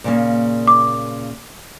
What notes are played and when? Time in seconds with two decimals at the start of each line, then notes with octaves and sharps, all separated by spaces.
0.04 A#2 C#3 A#3
0.67 D6